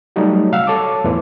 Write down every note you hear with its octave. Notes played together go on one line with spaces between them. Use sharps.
F#3 G3 A3 D#4 F#4
C3 F5 F#5 E6
A4 C#5 A5 D6
E2 A2 E3 C5